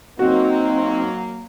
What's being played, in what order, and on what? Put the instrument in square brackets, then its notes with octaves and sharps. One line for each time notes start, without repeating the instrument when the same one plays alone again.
[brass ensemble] F#3 A#3 [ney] C4 [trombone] D#4 [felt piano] F#4